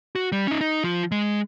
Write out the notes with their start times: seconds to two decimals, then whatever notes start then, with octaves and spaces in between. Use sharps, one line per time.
0.15 F#4
0.32 G3
0.47 C#4 D#4
0.61 D#4
0.84 F3 F4
1.12 G#3